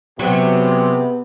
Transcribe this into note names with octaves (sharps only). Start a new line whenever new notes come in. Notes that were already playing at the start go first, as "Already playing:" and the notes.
C3 F#3 G#3 B3 G4